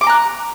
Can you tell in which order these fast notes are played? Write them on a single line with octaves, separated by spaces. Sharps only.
D6 C6 A#5 F#6